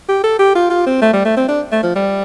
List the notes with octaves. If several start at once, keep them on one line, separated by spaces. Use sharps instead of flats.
G4
A4
G4
F4
F4
C4
A3
G3
A3
C4
D4
A3
F3
G3